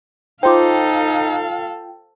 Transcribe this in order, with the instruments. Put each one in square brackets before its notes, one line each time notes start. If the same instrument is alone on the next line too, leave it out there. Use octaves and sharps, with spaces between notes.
[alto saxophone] D#4 [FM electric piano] F4 G5 [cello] A4 F5 [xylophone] C5 C6 D6